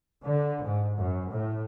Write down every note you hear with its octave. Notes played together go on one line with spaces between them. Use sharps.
D3
G#2
F#2
A2